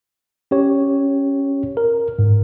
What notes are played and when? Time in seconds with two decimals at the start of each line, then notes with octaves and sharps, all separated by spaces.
0.51 C#4 G4 C#5
1.77 A#4
2.19 G#2